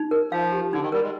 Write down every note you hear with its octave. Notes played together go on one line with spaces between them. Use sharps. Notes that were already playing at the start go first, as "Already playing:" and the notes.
Already playing: D#4
A#4
F3 F5
G4
D3 D#4
D#3
G3 A#4
G#3